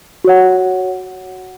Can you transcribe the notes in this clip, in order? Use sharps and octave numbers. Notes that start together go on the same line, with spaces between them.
F#4 C#5 F#5